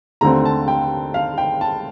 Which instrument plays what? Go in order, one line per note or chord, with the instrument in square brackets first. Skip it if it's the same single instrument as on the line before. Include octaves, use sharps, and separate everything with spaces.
[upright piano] D#2 D3 A3 C4 A#5
A5
G5
F5
G5
A5